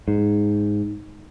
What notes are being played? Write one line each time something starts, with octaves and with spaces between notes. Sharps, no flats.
G#2